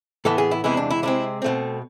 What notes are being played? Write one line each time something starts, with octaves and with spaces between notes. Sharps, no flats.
A2 E3 B3 A4
G#4
E4
E2 C3 E3 G#3 B3 E4
D4
E4
C3 G#3 C4 E4
B2 A3 C4